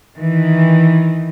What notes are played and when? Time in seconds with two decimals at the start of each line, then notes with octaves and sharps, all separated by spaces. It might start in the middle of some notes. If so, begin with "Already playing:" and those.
0.17 D#3 E3